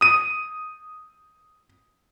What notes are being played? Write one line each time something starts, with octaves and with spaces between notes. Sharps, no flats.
D#6 D#7